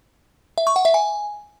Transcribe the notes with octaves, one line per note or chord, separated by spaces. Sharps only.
E5
C#6
F#5
E5
G#5